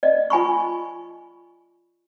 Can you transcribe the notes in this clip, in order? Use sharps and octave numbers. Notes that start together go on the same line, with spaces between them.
D5 D#5
F4 G#5 B5 C#6